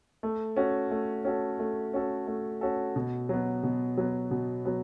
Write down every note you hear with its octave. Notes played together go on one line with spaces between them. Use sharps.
A3
C#4 F#4 A4
A3
C#4 F#4 A4
A3
C#4 F#4 A4
A3
C#4 F#4 A4
B2
F#3 B3
B2
F#3 B3
B2
F#3 B3